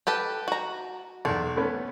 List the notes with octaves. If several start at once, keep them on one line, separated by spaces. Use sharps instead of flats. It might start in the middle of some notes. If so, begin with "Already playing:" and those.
G4 A4 B4
F#4 A#5
B1 E2 D4
A3 B3 C#4